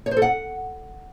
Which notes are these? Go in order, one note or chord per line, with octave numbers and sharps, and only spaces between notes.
C#5
C5
A4
F#5